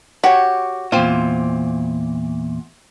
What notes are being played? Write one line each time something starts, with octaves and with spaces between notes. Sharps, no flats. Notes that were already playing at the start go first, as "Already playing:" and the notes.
F#4 G4 C#5
E2 A#2 C4 F4